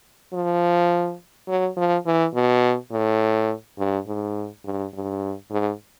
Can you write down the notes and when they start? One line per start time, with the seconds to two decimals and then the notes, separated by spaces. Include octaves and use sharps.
0.33 F3
1.48 F#3
1.77 F3
2.05 E3
2.34 B2
2.92 A2
3.78 G2
4.07 G#2
4.65 G2
4.93 G2
5.51 G#2